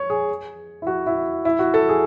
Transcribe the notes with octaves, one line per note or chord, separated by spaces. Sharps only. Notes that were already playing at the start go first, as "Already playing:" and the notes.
Already playing: C#5
G#4
E4
F#4
E4
E4
F#4
A4
G#4